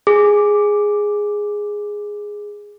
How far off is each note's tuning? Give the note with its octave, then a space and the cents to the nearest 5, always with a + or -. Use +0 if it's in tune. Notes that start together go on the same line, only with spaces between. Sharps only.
G#4 -5 D6 +0